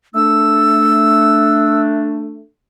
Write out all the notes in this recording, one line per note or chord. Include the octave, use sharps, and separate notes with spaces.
A3 D4 E6